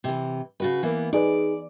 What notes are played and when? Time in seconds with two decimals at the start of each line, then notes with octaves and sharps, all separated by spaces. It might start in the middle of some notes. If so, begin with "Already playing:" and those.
0.04 C3 E3
0.60 C#3 F#4 B4
0.83 E3 A#3 B3
1.13 D#4 G#4 B4 D5